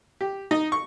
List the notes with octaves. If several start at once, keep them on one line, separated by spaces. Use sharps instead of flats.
G4
D#4
C#6